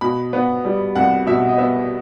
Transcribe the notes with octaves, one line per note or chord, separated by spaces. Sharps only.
B2 B5
B3
G3
C2 F#5
B2 E5
D#5
B3 E5